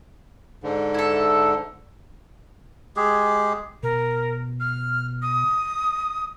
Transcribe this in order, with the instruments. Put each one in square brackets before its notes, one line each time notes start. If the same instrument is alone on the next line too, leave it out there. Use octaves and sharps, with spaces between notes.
[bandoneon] G#2 D3
[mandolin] E4 A4
[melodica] G#3 G4 G#4
[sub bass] B2 [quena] A#4
[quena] F6
D#6